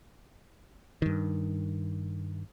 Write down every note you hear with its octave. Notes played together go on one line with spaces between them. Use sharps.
G2 D#3